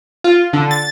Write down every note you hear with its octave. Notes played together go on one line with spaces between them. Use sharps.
F4
D3
A6